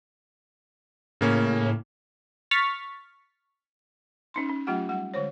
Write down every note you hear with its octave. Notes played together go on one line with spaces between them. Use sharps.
A2 C#3 A#3 C#4
C#6 F6 A6 B6
C#4 D#4 C6
C#4
F#3 A3 C#4 F4 G4 F#5
G3 F#5
D3 G#3 C5 C#5